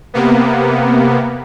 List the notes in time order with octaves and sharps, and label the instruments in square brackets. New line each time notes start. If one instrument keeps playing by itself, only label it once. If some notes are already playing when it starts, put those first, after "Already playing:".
[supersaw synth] C3 A#3 B3